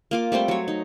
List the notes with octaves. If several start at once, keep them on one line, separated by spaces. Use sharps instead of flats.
A#3 F4 D6
G3 A3 C4 C5
F#3 C#5
D#4